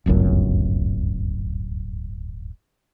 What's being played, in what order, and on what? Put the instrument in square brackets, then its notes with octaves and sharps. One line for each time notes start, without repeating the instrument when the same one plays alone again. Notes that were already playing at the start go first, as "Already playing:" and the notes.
[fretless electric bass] D1 G1 C#2 F#2